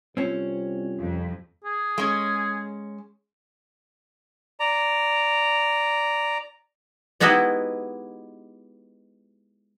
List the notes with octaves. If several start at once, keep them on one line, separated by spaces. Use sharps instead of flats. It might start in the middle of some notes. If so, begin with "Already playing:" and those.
C2 C4 C#4 F4
F2
G#4
G#3 C#4
D5 A#5
G#3 B3 D#4 E4 F#4 G4